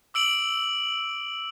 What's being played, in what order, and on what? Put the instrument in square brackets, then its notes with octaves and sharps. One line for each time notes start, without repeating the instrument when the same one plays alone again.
[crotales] D6 E6 D7 F#7